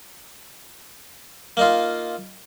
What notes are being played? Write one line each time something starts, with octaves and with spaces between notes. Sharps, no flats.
A#3 D#4 F4